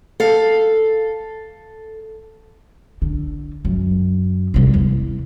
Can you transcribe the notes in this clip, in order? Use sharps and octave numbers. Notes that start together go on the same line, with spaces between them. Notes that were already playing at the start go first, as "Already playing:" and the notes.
A4 F5
D3
F#2
C3 G3
E2